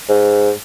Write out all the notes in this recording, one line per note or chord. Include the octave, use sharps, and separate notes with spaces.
G#2